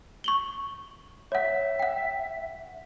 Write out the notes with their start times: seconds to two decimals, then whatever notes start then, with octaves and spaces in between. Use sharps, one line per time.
0.24 C#6 F#7 G7
1.32 C#5 E5 F#5
1.79 F#5 G5